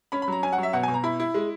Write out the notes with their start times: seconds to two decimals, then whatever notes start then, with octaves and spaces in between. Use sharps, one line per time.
0.12 C#4 B5
0.22 B5
0.28 F#3 A#5
0.43 C#4 G#5
0.53 F#5
0.58 F#3
0.63 E5
0.73 B2 F#5
0.83 G#5
0.88 B2
0.94 A#5
1.04 E4 B5
1.20 E4
1.34 G#3